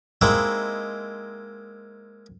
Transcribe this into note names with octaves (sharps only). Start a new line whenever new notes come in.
G#3 A#3 C4 D#4 E4